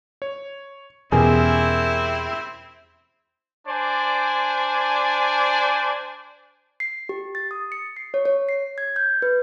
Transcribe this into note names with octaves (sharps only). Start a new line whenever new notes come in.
C#5
E2 B2 C4 C#4 E4 G4 G#4 A#4
D4 C5 D5 G#5
C7
G4
A6
D#6
C#7
C7
C#5
C#5
C7
G#6
G6
B4